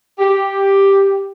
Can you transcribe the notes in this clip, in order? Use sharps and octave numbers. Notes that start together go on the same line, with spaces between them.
G4